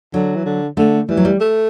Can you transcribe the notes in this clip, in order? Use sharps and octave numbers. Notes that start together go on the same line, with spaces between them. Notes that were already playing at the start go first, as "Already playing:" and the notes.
D3 F#3
E3
D3
D3 A3
E3 G3
F#3
G3
A3